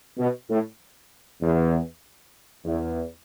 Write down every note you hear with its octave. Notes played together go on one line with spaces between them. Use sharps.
B2
A2
E2
E2